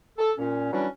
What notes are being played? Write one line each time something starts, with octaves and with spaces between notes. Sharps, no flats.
A4
A#2 C#4
E3 F#3 G3 C#4 D4 E4